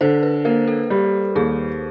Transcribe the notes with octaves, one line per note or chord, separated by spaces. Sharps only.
D3 C5
B4
A#3 A#4
A4
G3 G4
D#2 G#4